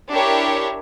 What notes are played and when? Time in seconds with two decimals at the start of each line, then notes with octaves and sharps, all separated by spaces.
0.10 D4 E4 G4 A#4 C#5